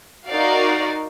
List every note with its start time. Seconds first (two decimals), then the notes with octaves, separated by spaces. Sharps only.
0.27 D#4 F#4 A#4 D5 F5